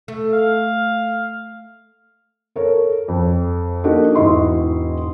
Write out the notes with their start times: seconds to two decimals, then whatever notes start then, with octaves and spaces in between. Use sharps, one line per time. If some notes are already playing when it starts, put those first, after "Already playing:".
0.08 A3
0.33 F5
2.56 A4 A#4 C#5
3.08 F2
3.84 A#3 D4 D#4 F#4 G4 A4
4.15 E1 G#2 E4 D#5 C6 C#6